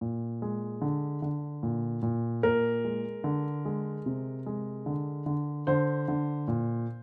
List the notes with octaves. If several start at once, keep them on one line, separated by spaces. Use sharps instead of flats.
A#2
G#3
D3
D3
A#2
A#2
A#2 A#4
G#3
D3
G#3
C3
G#3
D3
D3
D3 C5
D3
A#2